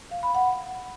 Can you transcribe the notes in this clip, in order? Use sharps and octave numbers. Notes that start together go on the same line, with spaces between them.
F5
B5
F#5